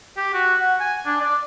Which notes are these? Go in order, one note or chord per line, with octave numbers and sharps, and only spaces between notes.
G4
F#4
F#5
G#5
D4
D5